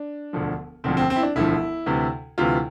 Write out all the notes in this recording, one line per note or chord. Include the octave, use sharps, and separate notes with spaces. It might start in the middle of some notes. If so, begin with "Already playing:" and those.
Already playing: D4
E1 D2 D3 F3
E1 D2 D3 F3 C4
C4
C4
E4
D4
E1 D2 D3 F3 E4
D2 C3 E3
D2 C3 E3 F4